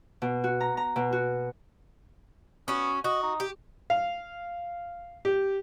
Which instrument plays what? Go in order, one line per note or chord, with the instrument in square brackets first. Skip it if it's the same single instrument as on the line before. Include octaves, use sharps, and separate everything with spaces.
[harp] B2
F#4
A#5
A#5
B2
F#4
[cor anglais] B3 [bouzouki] C#4 F#4
[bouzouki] F#4 [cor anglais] D#5
[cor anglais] D#4
[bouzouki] G4
[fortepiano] F5
G4